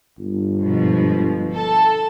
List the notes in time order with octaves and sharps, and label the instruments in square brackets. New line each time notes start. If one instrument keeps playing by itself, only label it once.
[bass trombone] G1
[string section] G#2 B2 F3
A4 A5